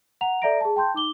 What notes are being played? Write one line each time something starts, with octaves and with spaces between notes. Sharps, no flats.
F#5 A#5 F7
A4 D5 E5 A#5 A#6 D7
G#4 A5
G5 A5 C6 G6
D#4 D6 G7